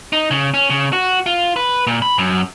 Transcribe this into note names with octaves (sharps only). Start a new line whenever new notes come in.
D#4
C#3
C#4
C#3
F#4
F4
B4
A#2
B5
F#2